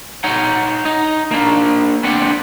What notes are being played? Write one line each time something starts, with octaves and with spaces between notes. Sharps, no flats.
D#4 C#5 F#5
D#4
A#3 D4
B3 C4 D4 F#5